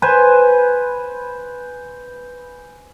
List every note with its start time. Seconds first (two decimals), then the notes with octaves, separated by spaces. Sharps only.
0.02 B4 C5 G#5